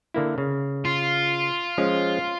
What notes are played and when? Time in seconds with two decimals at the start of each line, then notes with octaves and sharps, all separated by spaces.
0.14 D3 A#3 E4
0.38 C#3
0.85 F4
1.78 F3 G#3 C#4